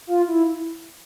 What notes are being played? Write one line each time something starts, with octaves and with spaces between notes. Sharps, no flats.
F4
E4